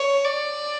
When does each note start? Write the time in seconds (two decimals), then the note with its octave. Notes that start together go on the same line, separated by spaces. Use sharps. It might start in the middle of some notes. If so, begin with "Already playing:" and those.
Already playing: C#5
0.24 D5